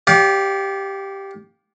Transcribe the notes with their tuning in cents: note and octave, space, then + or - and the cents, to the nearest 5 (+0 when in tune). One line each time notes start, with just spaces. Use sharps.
G4 +0 D5 -35 F5 +25